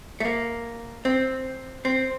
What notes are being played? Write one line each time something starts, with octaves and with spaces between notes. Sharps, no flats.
A3
A#3
C4
C4